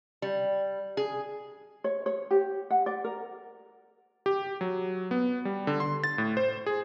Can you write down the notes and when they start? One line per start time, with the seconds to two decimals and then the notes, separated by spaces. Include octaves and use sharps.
0.22 G3
0.97 G#4
1.84 C#5
2.06 C#5
2.31 G4
2.70 F#5
2.86 D5
3.04 A#4
4.26 G4
4.61 F#3
5.11 B3
5.45 G3
5.67 D3
5.80 C6
6.04 A6
6.18 A2
6.37 C5
6.66 G#4